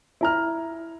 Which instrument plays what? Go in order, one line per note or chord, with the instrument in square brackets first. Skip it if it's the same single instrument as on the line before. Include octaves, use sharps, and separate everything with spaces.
[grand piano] E4 A#5 F6